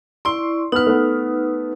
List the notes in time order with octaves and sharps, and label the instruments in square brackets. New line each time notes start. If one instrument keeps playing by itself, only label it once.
[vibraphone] E4 D5 C#6 [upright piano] C6
[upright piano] B3 F6 [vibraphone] D#4 B4
[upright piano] A3 B3